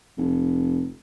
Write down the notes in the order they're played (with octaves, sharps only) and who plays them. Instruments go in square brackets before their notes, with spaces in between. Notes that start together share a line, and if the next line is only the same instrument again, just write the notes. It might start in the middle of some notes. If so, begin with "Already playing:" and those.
[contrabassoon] F1